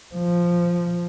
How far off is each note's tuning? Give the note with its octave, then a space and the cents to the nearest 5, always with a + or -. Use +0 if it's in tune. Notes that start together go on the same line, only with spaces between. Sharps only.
F3 -5